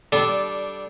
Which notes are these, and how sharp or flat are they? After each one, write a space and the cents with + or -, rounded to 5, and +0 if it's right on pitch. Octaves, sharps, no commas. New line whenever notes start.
G3 -15 D4 +0 A4 -20